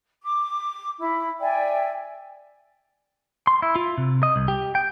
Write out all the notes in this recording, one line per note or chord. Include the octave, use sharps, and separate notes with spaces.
D6
E4
D5 E5 G5 G#5
C6
E4
F4
C3
D#5
C2
G4
G5